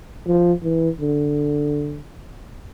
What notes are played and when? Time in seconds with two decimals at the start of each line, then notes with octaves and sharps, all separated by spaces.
0.27 F3
0.63 E3
1.00 D3